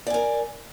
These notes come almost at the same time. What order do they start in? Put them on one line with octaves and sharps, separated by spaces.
D5 G#5 A#4